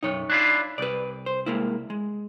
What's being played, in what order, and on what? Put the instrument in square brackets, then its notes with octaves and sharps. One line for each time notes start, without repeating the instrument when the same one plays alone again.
[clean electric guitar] B1 F#2 [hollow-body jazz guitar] D#4 C#5
[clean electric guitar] D4 E4 F4
[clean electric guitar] C2 [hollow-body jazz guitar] B4 D5
[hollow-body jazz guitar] C5
G#3 A#3 E4
G#3